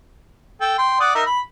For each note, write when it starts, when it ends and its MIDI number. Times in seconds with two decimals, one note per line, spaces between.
0.61 0.74 69
0.61 0.74 79
0.78 0.99 79
0.78 0.99 84
1.00 1.12 74
1.00 1.12 78
1.00 1.12 87
1.15 1.23 63
1.15 1.23 70
1.15 1.23 76
1.26 1.40 83